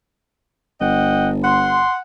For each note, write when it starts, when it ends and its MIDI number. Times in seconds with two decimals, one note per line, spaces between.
0.81 1.88 31
0.81 1.32 75
0.81 1.29 78
0.81 1.29 79
1.44 2.00 78
1.44 1.96 84